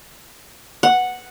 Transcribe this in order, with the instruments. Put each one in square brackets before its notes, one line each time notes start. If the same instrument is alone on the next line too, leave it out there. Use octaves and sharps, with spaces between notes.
[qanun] F#5